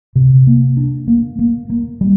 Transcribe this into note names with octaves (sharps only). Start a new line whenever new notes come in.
C3
A#3
D4
A#3
A#3
A#3
G3